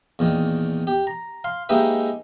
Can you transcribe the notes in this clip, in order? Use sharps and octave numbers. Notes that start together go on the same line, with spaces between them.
E2 A#2 D#3
G4
A#5
F5 C6
G#3 A#3 D#4 G4 B4 E5